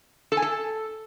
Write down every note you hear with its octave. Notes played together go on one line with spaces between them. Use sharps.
A4
G#5
A4